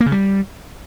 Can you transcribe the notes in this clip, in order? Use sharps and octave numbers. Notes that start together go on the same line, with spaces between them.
A#3
C#3
G3